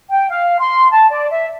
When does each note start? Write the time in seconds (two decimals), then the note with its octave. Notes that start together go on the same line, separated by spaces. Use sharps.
0.10 G5
0.30 F5
0.60 C6
0.90 A5
1.10 D5
1.30 E5